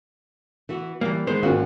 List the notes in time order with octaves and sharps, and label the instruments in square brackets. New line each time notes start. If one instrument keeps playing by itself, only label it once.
[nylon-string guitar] E3 B3 F#4
[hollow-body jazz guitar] E3 A#3 [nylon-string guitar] G3
[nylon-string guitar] D#3 [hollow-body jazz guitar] G#3 B3 C5
[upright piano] G#1 A#3 C#4 [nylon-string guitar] F4 F#4